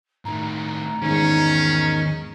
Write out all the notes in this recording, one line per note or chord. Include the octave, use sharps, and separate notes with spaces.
A2 D#3 A#5
E2 G#2 D#3 C#4